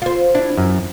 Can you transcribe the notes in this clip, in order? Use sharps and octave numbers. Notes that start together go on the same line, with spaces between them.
F4 C5
D4 E4
F#2